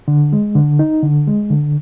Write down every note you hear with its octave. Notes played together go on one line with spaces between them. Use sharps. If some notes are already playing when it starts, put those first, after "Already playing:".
D3
G#3
D3
D#4
D3
G#3
D3